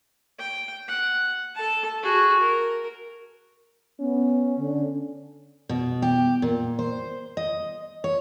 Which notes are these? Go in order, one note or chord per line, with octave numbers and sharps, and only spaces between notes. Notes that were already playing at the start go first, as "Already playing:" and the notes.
G5
F#5
A4 A5
F#4 G#4
A#4
B3 C#4
D3
B2
G4
A#2
C5
D#5
C#5